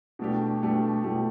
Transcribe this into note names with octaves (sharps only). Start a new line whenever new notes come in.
B2 A3 D4 G4
B2 A3 D4 G4
B2 A3 D4 G4